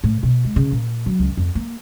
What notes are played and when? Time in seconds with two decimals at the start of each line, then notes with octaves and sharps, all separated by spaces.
0.04 A2
0.23 B2
0.45 G#3
0.56 C#3
0.72 A#2
1.06 F#3
1.19 C#2
1.37 F2
1.55 A#3